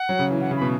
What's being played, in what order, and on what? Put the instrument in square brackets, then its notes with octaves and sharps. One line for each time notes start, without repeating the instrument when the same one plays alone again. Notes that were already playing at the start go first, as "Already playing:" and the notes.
Already playing: [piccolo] F#5
[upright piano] F#3
C#3
E3
[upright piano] E3 [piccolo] F#5
[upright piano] C#3
[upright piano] B2 [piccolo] B5